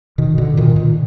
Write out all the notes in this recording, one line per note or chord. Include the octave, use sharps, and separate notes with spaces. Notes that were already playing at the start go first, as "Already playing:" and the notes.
B2 D#3
B2 D3
A#2 D#3
A#2